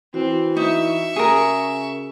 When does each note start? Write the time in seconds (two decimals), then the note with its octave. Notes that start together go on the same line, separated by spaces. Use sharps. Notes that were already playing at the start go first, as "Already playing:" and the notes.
0.14 E3 C4 F#4
0.57 D#4 E5 C#6
1.16 C#3 G#4 A#4